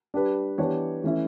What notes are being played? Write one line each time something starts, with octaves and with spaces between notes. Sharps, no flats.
G3 D4 G4 B4
E3 B3 D4 G4 C#5
E3 A3 C#4 E4